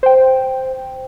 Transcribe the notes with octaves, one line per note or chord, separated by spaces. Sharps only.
C5 G5